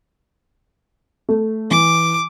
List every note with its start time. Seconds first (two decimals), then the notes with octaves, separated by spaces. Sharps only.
1.29 A3
1.71 E3 D6